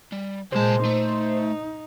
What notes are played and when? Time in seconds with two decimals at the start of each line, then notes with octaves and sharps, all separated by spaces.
0.12 G3
0.52 C2 A#2 G#3 C5 A5
0.85 A3 D#4